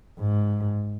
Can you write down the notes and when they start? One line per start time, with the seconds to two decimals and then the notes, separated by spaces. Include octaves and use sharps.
0.19 G#2